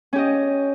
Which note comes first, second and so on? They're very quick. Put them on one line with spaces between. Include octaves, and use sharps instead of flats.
C#4 G4 D#5